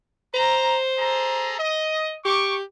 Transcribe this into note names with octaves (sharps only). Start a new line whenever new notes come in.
C5 A#5
G#4 A4 A#5
D#5
G4 C#6 D6